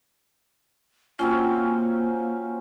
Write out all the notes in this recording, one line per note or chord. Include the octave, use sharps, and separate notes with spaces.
F#3 A#3 C4 C#4 F4